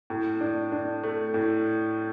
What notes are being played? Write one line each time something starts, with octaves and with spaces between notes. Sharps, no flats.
A2
D4
D4
A3
A2